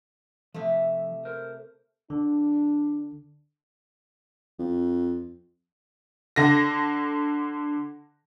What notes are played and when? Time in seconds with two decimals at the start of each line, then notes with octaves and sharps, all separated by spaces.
0.54 C3 F3 A3 E5
1.25 A#4 C5
2.10 D3 D4
4.59 F2
6.36 D3 A#6